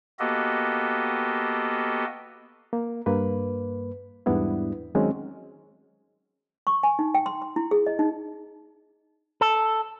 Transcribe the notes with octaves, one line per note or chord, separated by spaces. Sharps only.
A#3 B3 F#4 G4 A4 D#5
A#3
G2 A#3 B4
E2 G#2 G3 B3 D4 E4
D#3 F#3 G#3 C4 C#4
C#6
G#5
D#4
G5
C6
C6
E4
G#4
D#5
D#4
A4